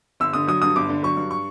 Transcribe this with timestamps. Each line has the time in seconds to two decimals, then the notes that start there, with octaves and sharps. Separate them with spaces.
0.20 G1 E6
0.33 D3 D#6
0.47 F#3 D#6
0.62 G2 D#6
0.76 G1 D6
0.89 D3
1.03 F#3 C#6
1.17 G2
1.31 C#6